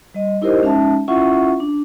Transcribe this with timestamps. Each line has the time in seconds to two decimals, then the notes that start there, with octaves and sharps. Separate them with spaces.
0.14 G3 D#5
0.42 D#4 E4 G4 A#4 C5 D#5
0.62 G#3 C#4 D#4 E5 A5
1.08 C#4 E4 F4 E5 F#5 C#6
1.60 D4